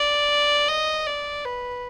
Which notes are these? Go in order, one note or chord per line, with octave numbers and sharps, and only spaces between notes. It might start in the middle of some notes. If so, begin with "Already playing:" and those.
Already playing: D5
D#5
D5
B4